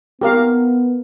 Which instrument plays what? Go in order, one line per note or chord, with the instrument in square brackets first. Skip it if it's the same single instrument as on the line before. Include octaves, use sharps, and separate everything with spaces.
[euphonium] B3 [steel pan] G4 A#4 F5